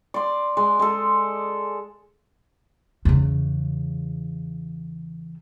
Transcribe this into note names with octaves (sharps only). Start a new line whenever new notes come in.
D5 C6
G#3 D5
G#3 A4
E2 C#3